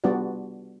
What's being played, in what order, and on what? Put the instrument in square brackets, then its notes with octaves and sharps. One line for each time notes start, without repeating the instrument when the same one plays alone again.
[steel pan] G3 B3 D4 F4 F#4 D5